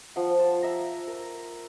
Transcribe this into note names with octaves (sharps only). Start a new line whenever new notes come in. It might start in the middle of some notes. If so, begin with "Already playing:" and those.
F3 F#5
A5 C6
E5 A#5
A#4